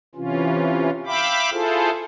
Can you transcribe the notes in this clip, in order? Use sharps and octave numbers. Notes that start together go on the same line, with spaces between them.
C3 E3 C#4 F4
E5 F5 G5 B5 D6
E4 F4 G#4 A4 C5